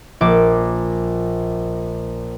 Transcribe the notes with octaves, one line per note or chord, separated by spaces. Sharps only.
A#1 D6